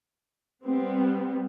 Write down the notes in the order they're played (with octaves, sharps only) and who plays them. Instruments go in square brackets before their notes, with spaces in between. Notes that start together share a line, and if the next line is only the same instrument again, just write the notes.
[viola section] G3 B3 C4